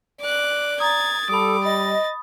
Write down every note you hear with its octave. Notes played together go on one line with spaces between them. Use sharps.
D5 D6 F#6
A#5 D#6 G#6 A6
G3 A4 B5 D6 D#6
D#5 A6